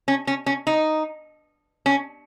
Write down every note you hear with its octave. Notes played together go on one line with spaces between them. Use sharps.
C#4
C#4
C#4
D#4
C#4